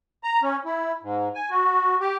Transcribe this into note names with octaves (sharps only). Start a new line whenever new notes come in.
A#5
C#4
E4
G#2
G#5
F#4
G4